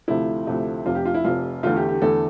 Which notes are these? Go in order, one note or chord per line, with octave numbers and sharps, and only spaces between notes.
D2 C3 F3 A3 E4
D2 C3 F3 A3
F1 F2 C3 F4
G4
F4
E4
F1 F2 C3 F4
E2 D3 A3 F4
G4
G4
E2 D3 A3 A4